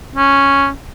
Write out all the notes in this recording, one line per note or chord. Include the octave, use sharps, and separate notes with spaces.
C#4